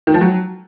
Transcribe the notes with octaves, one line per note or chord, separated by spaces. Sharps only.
D#3
F3
F#3